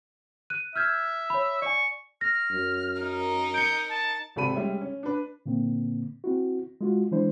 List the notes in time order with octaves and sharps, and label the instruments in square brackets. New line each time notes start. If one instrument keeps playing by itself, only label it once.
[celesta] F#6 D#7
[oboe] E5 [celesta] F6 G6 G#6
[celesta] C#5 B5
[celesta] D5 G#5 [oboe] C#6
[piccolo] F6 [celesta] A#6
[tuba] F#2
[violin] D#4 A#4
[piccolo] G6 [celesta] C#7 D7
[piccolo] A5
[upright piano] G#1 C3 A4 B5 D#7
G3 G#3 C#4 E5
C#4
D4 B4
[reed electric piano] A#2 D3 A#3 C4
C4 E4 F#4
G#3 F4 F#4
E3 F#3 G#3 D4 E4 C5